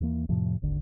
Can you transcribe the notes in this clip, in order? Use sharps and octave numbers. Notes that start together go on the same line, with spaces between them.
D#2 E3 A#3
F2 A2 C3 F3
D#1 G#1 D3